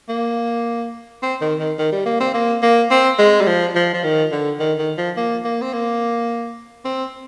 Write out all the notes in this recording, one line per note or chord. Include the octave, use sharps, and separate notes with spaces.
A#3
C4
D#3
D#3
D#3
G3
A#3
C4
A#3
A#3
C4
G#3
G3
F3
F3
F3
D#3
D3
D#3
D#3
F3
A#3
A#3
C4
A#3
C4